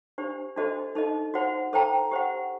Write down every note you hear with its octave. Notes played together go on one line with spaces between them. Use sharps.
D4 G4 C5
D4 F#4 A4 C5 D#5
D#4 A4 D#5
F#4 C5 F#5
A4 C5 G5 A#5
G4 C5 F#5